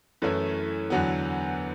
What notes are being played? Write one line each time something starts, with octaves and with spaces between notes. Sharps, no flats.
F#2 E3 A3 C#4 E4
E2 D3 F#3 B3